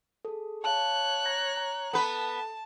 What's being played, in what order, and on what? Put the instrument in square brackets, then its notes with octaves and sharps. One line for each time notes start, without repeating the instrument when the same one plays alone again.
[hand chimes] G#4 A4
[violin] C#5 F#6 [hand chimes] F5 A5
[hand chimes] A#5 G#6 A#6
A#5
[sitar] B3 B4 [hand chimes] A4 [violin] A5